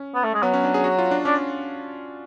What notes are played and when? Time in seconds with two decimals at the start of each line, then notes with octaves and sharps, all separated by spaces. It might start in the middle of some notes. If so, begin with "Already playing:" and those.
Already playing: C#4
0.15 B3
0.24 A3
0.34 G#3
0.43 F#3 B3
0.53 C#4
0.64 D4
0.74 G#4
0.84 F#4
0.99 F4
1.11 D4
1.25 C#4 D4